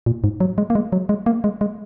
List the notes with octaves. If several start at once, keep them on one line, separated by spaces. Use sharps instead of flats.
A#2
G#2
F#3
G#3
A#3
G#3
F#3
G#3
A#3
G#3
G#3